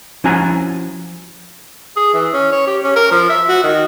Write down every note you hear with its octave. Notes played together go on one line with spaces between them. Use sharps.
F3 C#4 E4 F#4 G#5 A#5
G#4
E3
C#4
C#5
G4
C#4
A#4
F3
E5
F#4
D#3